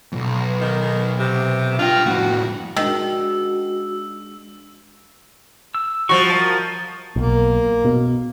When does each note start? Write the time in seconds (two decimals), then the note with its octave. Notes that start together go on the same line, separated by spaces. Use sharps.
0.12 B1 F2
0.61 D#3
1.18 C3
1.79 D4 F4 G5
2.06 F2 A2 F#4
2.76 D#3 G#3 D4 F#4 E6
5.75 E6
6.09 F3 G3 F#4 C#6
6.30 A#4 D#5 A5
7.16 B1 A#3
7.85 B2